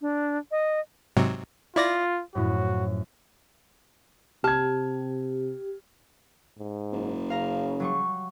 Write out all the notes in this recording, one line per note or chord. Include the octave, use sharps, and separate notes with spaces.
D4
D#5
G#2 C3 F#3
E4 F4 D5 A#6
F#2 A2 F3 F#4
C3 G4 A5 F6 G#6
G#2
F#1
C#3 F5 A#5
F#3 G3 C#6